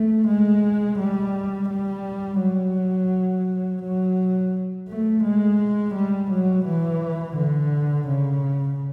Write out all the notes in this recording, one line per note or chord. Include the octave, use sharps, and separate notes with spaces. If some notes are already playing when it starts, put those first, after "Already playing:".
Already playing: A3
G#3
G3
G3
F#3
F#3
A3
G#3
G3
F#3
E3
D3
C#3